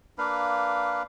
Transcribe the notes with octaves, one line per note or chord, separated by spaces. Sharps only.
A#3 D4 B4 F5